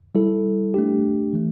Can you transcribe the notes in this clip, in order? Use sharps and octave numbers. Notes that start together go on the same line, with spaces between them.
G3 E4 A4
A3 D4 G4
E3 A3